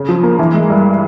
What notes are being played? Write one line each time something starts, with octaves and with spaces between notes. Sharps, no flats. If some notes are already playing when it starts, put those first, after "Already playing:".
Already playing: C#3
F3
A#3
E3
G#3
G2